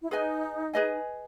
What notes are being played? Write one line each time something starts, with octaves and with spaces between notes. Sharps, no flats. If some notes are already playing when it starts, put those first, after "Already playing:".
E4
D#4 G#4 B4 D#5 G#5
G#4 B4 D#5 G#5